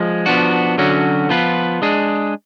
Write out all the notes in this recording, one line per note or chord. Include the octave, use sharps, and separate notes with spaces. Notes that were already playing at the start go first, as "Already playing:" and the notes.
Already playing: F3 G#3
F3 B3 D4 F#4
D3 F#3 C#4 F#4
F3 B3 F4 B4
G#3 D4 G#4